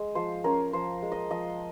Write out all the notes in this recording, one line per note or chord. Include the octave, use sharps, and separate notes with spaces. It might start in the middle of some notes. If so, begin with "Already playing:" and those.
Already playing: G#3
F3 C5
C#4 A#4
F3 C5
G#3
D#5
F3 D#5